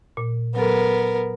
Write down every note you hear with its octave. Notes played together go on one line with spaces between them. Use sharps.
A#2
F#3 B3 A4 A#4